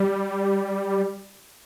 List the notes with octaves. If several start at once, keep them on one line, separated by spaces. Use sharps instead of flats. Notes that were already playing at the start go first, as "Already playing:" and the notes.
Already playing: G3